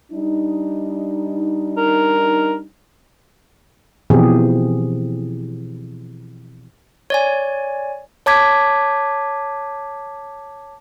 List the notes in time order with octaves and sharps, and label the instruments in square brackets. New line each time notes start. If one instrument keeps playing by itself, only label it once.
[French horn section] G3 D4 D#4
[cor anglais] A#4
[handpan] B2 E3 F3 C4 G4 G#4
[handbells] C#5 D5 G#5
[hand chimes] C#5 A5 D6 G#6 B6